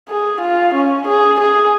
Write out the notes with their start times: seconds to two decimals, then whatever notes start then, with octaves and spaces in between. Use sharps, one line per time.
0.09 G#4
0.41 F4
0.75 C#4
1.08 G#4
1.40 G#4